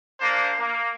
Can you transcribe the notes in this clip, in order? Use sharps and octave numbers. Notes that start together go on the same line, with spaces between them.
A#3 D4 C5
A#3